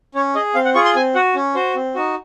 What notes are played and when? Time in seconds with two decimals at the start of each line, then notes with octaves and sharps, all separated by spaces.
0.15 C#4 C#5
0.35 G#4 D#5
0.55 C4 F5
0.65 F#5
0.75 F4 G#4 C#6
0.85 C6
0.95 C4 G#5
1.15 F#4 F#5
1.35 C#4
1.55 F#4 C5
1.75 C4
1.95 D#4 F#4